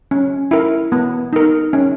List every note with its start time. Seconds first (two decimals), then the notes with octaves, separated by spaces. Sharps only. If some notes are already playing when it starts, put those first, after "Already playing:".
0.11 C#4
0.51 E4 A#4
0.92 B3
1.33 D#4 A#4
1.73 C#4